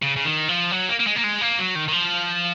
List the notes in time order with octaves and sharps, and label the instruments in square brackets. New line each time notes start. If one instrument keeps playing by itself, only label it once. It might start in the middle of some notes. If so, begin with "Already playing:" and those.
[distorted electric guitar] C#3
C#3
D#3
F3
F#3
A#3
A#3
G#3
A#3
G#3
A#3
F#3
D#3
D#3
F3